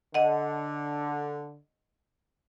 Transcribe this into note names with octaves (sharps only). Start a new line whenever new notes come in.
D3 D#5 F#5